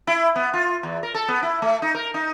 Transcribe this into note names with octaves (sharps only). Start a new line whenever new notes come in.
E4
B3
F4
E2
A#4
A4
B3
E4
A3
D#4
A#4
D#4